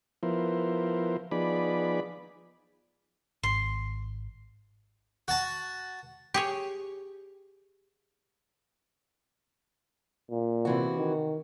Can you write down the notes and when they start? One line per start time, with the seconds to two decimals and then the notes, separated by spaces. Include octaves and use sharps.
0.23 F3 B3 E4 A#4 C5
1.31 F3 B3 D#4 G#4 D5 B5
3.43 G#1 C6
5.28 F#4 A5
6.34 G4 G#4 C#5
10.30 A#2
10.65 C3 E3 F#4
10.97 D#3